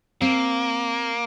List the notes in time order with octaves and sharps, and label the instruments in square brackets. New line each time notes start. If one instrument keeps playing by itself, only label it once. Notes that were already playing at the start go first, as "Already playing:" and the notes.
[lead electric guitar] A#3 [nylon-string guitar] C4